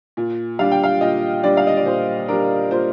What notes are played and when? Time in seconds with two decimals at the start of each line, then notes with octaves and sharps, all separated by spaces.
0.17 A#2
0.59 G3 D4 F5
0.71 G5
0.84 F5
1.01 A#2 D#5
1.43 G3 D4 D5
1.57 F5
1.67 D#5
1.77 D5
1.86 A#2 C5
2.28 G3 D4 A#4
2.71 A#2 C5